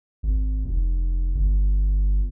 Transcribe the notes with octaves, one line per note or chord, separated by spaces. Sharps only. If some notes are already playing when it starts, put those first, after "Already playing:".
G#1
F1
G1